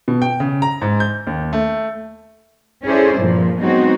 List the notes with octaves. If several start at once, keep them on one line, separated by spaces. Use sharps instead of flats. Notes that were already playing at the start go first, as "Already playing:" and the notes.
B2
G5
C#3
A#5
G#2
G6
D#2
A3
C#4 E4 G#4 A4 C5 D5
G2 A#2 F3
F#3 G#3 B3 C4 D#4 F#4